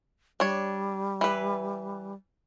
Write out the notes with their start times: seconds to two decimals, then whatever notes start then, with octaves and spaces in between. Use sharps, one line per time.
0.40 G3 D4 C#5
1.21 E3 B4